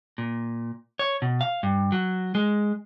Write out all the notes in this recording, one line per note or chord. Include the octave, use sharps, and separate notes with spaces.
A#2
C#5
B2
F5
G2
F#3
G#3